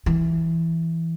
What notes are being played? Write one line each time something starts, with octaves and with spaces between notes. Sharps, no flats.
E3